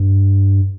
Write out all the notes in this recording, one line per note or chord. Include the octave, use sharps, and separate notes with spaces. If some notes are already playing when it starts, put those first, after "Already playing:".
Already playing: G2